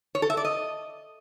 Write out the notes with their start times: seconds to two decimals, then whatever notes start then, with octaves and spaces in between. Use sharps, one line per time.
0.15 C#5
0.22 A4
0.30 E5
0.37 D5
0.45 D#5